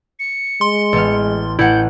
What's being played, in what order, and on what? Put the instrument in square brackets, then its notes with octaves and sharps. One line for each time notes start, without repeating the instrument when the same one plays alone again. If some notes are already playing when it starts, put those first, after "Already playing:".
[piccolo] C#7
[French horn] G#3 [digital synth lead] C6
[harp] A1 B3 F6
[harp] A1 F#5 [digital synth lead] E4 [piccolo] G6